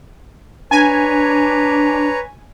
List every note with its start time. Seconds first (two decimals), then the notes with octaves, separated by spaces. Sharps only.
0.71 D4 B4 C#5 G#5 A#5